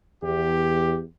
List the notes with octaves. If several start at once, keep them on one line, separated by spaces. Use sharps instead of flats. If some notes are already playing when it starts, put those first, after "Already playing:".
E2 G4